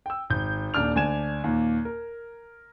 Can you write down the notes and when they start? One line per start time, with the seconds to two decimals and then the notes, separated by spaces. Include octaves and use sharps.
0.06 G5 E6
0.30 G#1 G6
0.74 D#1 D#2 D4 F6 F7
0.95 D2 D4 G#5 G#6 E7
1.44 D#2 A#2
1.85 A#4